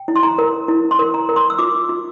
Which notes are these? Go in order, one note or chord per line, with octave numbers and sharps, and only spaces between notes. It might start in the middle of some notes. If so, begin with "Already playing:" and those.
Already playing: G5
E4
C6
A#5
A#4
E4
C6
A#4
A#5
A#4
C6
E6
F4 D6
F4